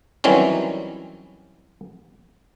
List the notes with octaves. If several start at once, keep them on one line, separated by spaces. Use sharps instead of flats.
D#3 E3 F#3 G3 C4 C#4